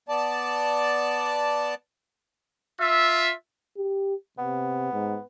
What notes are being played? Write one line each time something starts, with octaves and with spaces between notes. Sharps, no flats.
B3 D5 A5
F4 E5
G4
C3 B3
G#2